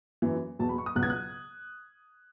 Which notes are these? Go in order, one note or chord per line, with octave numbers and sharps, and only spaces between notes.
F#2 E3
E2 B2 F#3 A5
B5
C#6
D#6
C#2 B2 F#3 F#6
G#6
F#6